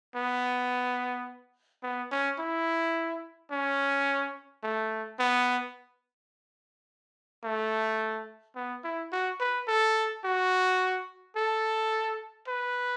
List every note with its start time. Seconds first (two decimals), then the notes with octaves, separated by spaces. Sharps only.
0.15 B3
1.83 B3
2.11 C#4
2.39 E4
3.51 C#4
4.63 A3
5.19 B3
7.44 A3
8.56 B3
8.84 E4
9.12 F#4
9.40 B4
9.68 A4
10.24 F#4
11.36 A4
12.48 B4